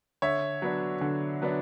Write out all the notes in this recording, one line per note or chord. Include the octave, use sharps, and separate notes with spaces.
D3 C#5 E5
F#3 B3 D4
D3
F#3 B3 D4